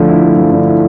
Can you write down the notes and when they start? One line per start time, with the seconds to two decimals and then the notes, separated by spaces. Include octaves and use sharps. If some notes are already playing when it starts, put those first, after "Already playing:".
Already playing: D3 F3 A3
0.09 E4
0.23 A3
0.37 F3
0.52 D3
0.66 E4